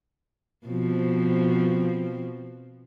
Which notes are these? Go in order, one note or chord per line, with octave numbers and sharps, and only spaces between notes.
B2 F3 C4